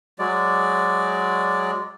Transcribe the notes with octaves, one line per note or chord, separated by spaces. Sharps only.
F#3 G#3 D5